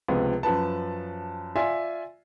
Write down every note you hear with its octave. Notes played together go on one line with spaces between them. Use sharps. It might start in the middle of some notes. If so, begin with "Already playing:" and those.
C#2 C3 F3 B3
F#2 F3 B4 A5
F4 D5 E5 G#5 C6